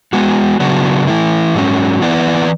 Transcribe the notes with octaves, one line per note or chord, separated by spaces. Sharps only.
G#3 B3 F#4
C#3 F#3 B3 D4 F#4
E3 A3 E4
G#2 F#3 C#4
E3 B3 E4 B4 D5